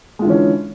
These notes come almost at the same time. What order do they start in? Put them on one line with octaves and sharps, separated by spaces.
G#3 F4 D3 E3 C#4